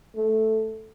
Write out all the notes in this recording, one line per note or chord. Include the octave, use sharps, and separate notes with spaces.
A3